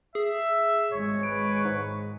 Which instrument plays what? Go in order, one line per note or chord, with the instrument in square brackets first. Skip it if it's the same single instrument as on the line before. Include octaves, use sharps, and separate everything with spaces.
[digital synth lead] G#4 [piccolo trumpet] E5
[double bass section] G#1 G#3 [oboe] C#5
[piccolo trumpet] B4 [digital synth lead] D7
[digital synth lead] G#2